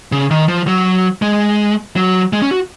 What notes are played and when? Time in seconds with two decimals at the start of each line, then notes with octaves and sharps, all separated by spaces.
0.12 C#3
0.31 D#3
0.48 F3
0.67 F#3
1.22 G#3
1.96 F#3
2.33 G#3
2.42 C#4
2.51 F#4